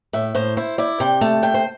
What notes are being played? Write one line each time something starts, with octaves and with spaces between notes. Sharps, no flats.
A2 E5
A2 C5
E4 C5
E4 D5
C3 G5
A3 A5
C3 G5
C5